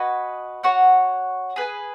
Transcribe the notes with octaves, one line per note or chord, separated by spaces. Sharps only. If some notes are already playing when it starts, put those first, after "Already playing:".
Already playing: F#4 B4 D#5 G#5
F#4 C#5 F#5
G#4 B4 G#5